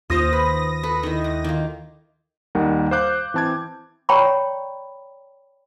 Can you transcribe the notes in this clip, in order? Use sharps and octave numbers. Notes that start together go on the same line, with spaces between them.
D#2 F4 C5 F5 D#6 A#6
B4
A4 B4
D#3 E4
G#2
D#3 A#3 F4
D#2 D#3 G3 F#5
C5 F5 D6 F#6 G6
E3 C4 A5 D6 G#6
C#5 D5 G5 A#5 B5 C#6